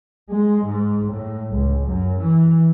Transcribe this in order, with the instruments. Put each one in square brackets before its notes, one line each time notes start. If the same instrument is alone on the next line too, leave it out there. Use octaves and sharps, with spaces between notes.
[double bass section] G#3
G#2
A2
C#2
F#2
E3